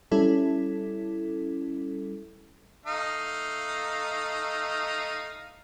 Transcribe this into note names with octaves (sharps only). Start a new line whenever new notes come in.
G3 C#4 E4 A4
A3 D#4 F5